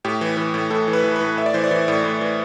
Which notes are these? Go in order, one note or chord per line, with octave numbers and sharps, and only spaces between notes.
A2 G4
E3
E3
A2
A2 A4
E3
B4
E3
A2 B4
A2 E5
D5
E3 C5
D5
E3
A2
A2
E3